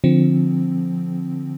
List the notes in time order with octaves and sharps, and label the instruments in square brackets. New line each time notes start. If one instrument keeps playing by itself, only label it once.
[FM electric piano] D3 F3 C4